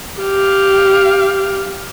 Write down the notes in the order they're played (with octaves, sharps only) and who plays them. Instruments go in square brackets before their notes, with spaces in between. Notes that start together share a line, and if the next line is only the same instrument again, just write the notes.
[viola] G4 F5